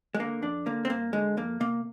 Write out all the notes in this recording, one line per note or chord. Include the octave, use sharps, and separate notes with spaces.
G#3
D3 A#3
F2 D4
D3 A#3
C4
G2 A#3
D3 G#3
F2 A#3
C3 A#3